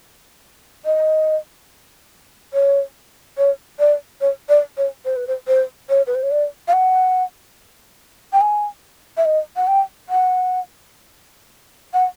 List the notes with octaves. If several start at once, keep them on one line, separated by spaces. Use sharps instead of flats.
D#5
C#5
C#5
D5
C#5
D5
C#5
C5
B4
C5
C5
C#5
B4
C5
C#5
D5
F5
F#5
G5
G#5
E5
D#5
F#5
G5
F#5
F#5